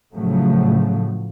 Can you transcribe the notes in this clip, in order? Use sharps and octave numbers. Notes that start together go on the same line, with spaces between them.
A2 C#3 F3 F#3 A3